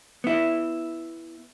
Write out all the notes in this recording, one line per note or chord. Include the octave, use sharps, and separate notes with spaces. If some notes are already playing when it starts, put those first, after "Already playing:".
B3 E4